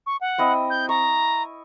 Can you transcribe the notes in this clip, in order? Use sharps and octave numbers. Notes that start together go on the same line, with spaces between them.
C#6
F#5
C4 E4 D#5
G6
A#5 C#6